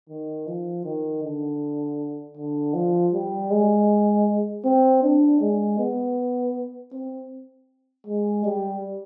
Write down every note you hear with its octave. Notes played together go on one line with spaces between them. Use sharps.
D#3
F3
D#3
D3
D3
F3
G3
G#3
C4
D4
G#3
B3
C4
G#3
G3